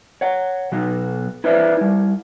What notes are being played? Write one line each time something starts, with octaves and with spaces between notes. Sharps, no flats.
C#5 F#5
B2 F#3 F#4
E4 B4 C5 D5 E5
G3 E4